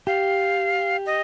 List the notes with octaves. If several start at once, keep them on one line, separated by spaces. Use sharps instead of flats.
G4 F5
D#5